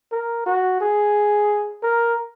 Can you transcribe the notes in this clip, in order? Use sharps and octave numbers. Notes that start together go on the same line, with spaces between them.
A#4
F#4
G#4
A#4